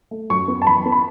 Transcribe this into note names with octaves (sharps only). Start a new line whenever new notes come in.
A3
F#2 C#6
B3
A5
E3 B5
B3
B5